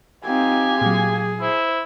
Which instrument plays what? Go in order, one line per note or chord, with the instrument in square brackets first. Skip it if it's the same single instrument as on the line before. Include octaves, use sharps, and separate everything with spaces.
[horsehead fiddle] C4 D#4 [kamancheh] F4 G4 [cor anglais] G#5
[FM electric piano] A#2 F#3 [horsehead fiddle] G#4
[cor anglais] E4 [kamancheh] C5